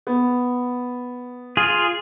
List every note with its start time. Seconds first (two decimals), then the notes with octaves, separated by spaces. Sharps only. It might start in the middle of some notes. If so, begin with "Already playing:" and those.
0.07 B3
1.57 F4 G#4